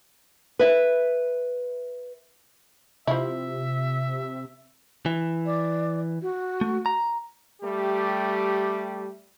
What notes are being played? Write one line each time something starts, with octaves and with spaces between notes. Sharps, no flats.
B4 E5
C3 F3 E4 E5
E3
D5
F#4
A3
A#5
G3 A3 G4